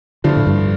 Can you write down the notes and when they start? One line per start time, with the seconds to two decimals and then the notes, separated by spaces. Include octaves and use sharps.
0.24 G2 D3 F3 A3 D4 F4
0.37 A2
0.47 G2